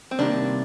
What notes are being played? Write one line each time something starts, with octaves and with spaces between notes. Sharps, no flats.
C4
C2 C3 D#3 A#3 D4